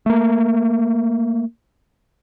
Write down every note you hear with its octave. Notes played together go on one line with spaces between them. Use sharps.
A3 A#3